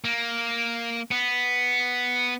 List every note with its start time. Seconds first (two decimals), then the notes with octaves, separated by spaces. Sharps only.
0.05 A#3
1.11 B3